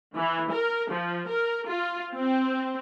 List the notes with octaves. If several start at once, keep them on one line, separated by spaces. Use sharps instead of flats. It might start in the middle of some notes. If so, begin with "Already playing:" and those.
E3
A#4
F3
A#4
F4
C4